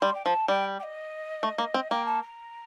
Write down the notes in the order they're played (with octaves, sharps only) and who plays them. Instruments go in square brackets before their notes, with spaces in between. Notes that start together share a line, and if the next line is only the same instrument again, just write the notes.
[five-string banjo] G3 [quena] C6
[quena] G5
[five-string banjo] F3 [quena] A5
[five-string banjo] G3 [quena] G5
[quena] G5
D#5
[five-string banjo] A3
A#3
C4
[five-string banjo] A#3 [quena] G5
[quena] A5
A#5